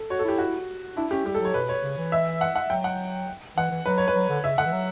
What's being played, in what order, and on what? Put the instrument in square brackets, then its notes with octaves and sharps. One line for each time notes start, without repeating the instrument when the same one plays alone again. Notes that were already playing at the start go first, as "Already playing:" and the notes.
Already playing: [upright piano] A4
[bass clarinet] F#4 [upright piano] C#5
[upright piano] A4
[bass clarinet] E4 [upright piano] G4
[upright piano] F#4
[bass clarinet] D4 [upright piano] E4
[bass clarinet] C#4 [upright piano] G4
[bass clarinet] G3 [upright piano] G4
[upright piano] A4
[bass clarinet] F#3 [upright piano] C#5
[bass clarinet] B2 [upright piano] B4
[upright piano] C#5
[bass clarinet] C#3
E3
[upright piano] E5
F#5
F#5
[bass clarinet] F#3 [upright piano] G5
[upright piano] F#5
[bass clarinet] E3 [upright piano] F#5
[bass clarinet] E3
[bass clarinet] F#3 [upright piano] B4
[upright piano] C#5
B4
[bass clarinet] F#3
D3
[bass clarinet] C#3 [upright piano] E5
[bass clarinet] D3 [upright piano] F#5
[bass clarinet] E3
F#3